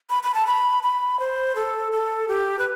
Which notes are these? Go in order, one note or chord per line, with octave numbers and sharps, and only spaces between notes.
B5
B5
A5
B5
B5
C5
A4
A4
G4
B4